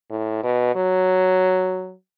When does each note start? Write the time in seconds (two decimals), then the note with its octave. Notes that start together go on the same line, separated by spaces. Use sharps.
0.10 A2
0.43 B2
0.76 F#3